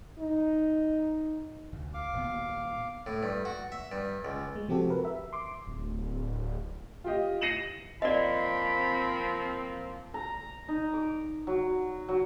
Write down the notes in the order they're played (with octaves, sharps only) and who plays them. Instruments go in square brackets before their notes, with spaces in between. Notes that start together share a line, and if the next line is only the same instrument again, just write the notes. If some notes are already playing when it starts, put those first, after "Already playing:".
[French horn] D#4
[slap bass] D2
[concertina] F5 D6
[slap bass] D#1 A#2 B3
[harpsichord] A2
G2
F#4
E5
G2
C#2
[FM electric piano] G#3
C3 F3 C4 F#4 G4 A4
A#4 B4
E5
C6 D6
[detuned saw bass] D1
[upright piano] F4 G4 D#5
A#6 C7 C#7 D#7 E7 F#7
[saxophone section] F3 A#3 C4 [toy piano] D5 D#5 [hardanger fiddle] B5
[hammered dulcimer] A#5
D#4
D6
F#3
F#3